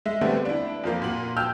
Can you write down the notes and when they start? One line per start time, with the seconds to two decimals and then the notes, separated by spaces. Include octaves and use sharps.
0.06 G#3 E5
0.21 D3 G3 A3 B3 C4
0.45 D4 E4
0.84 F2 F3 A#3
1.02 A#2 F#4 F#7
1.37 G5 A5 E6 F6 G6